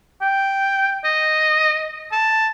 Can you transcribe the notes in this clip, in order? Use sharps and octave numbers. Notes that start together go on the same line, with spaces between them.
G5
D#5
A5